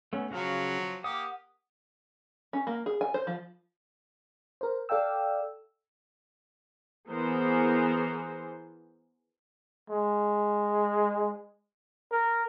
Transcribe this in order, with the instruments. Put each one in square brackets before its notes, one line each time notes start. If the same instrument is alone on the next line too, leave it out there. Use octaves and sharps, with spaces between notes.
[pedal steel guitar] A3 B3 C#4
[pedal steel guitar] C#3 F#4 F5 [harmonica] F3 F#3
[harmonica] A#3 G4 [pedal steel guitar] F#5 D#6
[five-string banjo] C#4
A#3
G#4
G#5
C5
F3
[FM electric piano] A#4 C5
A4 D5 F5 G5 E6
[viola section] E3 B3 G#4 A#4 C5
[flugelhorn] G#3
A#4